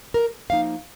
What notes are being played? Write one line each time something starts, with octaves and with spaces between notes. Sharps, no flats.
A#4
F3 A#3 D#4 F5